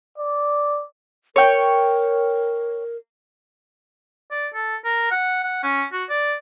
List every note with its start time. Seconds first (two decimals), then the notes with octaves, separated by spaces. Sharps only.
0.18 D5
1.36 A#4 C#5 G5
4.31 D5
4.54 A4
4.85 A#4
5.11 F#5
5.43 F#5
5.63 C#4
5.92 F#4
6.09 D5